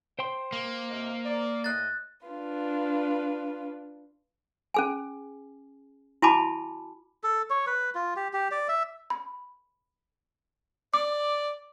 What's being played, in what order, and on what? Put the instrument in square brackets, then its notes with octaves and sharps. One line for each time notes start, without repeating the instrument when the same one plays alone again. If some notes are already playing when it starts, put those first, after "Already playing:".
[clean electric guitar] C5 G5 C6
[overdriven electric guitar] A#3
[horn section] C3 D#4 F5
A#4 D5
[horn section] A2 D#5 [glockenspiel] F#6 A6
[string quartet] D4 F4 B4
[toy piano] C#4 G#4 G#5
E4 F#4 G#5 A5 B5 D6
[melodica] A4
C#5
B4
F4
G4
G4
D5
E5
[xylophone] B5
[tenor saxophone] D5 [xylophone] D6